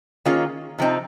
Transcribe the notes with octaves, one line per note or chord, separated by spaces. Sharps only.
D#3 A#3 C#4 F4 G#4
C3 F3 C4 D#4